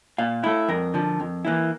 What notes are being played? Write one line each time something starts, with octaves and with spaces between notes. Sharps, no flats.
A#2 F5
A3 E4
F2 A#4
D3 F3
F2
E3 A#3 E4